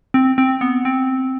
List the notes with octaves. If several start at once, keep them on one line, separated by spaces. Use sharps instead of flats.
C4
C4
B3
C4